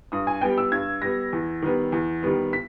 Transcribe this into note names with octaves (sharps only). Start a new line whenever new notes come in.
G2 D#6
G#5
G3 B3 G5
E6
G2 G#6
G3 B3 A#6
E2
D#3 G3 B3
E2
D#3 G3 B3
B6